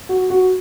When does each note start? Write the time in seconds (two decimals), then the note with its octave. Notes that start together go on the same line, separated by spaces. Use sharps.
0.09 F#4
0.30 F#4